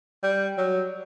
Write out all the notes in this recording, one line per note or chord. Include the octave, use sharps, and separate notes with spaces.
G3
F#3